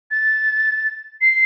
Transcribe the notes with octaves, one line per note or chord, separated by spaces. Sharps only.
A6
C7